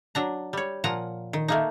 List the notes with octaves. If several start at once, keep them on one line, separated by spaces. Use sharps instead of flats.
F#3 D4 A#5
G3 C#5
A#2 F3 F#5 A#5
D#3
A3 A#3 D#4